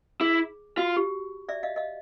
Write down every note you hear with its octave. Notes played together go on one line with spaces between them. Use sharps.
E4 G#4
F4 F#4
G4
D5 E5
D#5 F5
D#5 F5